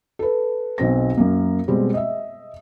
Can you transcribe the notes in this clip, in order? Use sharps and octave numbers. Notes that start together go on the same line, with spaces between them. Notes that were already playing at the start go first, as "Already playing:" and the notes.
A4 B4
B1 B2 C4 A#6
F#2 A#3
B2 G3 G#3 C4
D#5 E5